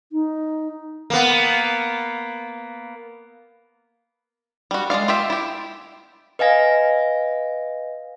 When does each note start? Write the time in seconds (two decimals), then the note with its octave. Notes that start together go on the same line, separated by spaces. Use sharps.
0.12 D#4
1.10 A#3 B3
4.71 G3 F#4
4.90 G#3 C#4 D5 F5
5.08 F4 G4 E5
5.30 E4 G4
6.39 B4 D#5 F5 G#5 A#6